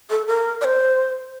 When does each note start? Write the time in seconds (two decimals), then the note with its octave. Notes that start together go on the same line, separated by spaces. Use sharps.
0.10 A4
0.27 A#4
0.61 D5
0.64 C5